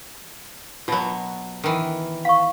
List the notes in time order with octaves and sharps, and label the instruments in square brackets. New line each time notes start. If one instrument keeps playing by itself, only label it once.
[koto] B2 F#3 [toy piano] F4 B4
[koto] D#3 E3
[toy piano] F5 C#6